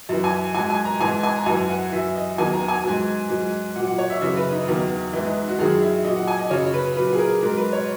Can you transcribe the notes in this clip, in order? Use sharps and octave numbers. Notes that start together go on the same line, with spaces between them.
F#2 E3
G#5
G#2 F#3 G#5
G#5
A#5
G#2 E3 G#5
G#5
A#5
F#2 E3 G#5
F#5
F#2 E3 E5
D#5
E2 D#3 F#3 G#5
A#5
G#5
G#2 F#3
G#2 F#3
A#2 F#3 F#5
F#5
C#5
E5
F#2 C#3 E3 E5
B4
D#4
E2 D#3 F#3
G#2 E3 E4
D#4
F#4
F#2 D#3 F#3 G#4
E4
A#2 F#3 D#5
F#5
G#5
D#5
F#2 C#3 F#3 C#5
B4
A#2 F#3 B4
G#4
A#4
G#2 F#3 A#4
B4
C#5